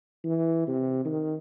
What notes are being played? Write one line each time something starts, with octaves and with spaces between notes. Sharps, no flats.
E3
C3
D#3